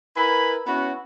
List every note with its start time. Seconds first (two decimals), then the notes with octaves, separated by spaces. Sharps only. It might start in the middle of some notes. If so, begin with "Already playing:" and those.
0.16 E4 A#4 B4 G#5 B5
0.67 B3 C#4 E4 F#4